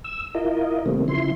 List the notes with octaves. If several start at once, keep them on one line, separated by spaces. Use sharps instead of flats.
E6
E4 F4 A#4 D#5
C3 D#3 G3 A3 A#3 C4
C#3 F3 E4 C6